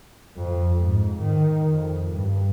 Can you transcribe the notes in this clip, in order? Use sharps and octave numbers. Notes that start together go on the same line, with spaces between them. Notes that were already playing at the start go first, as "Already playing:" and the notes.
F2
G#2
D#3
F2
G2